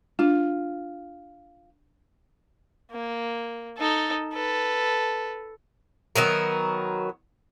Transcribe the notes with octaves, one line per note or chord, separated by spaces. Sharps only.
D4 F4
A#3
D#4 A4
A4 B4
D#3 F#3 B3 A#4